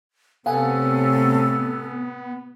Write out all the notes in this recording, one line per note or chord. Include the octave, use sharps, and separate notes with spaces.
A2 C3 B3 C#4 A4 F5 F#5 G#5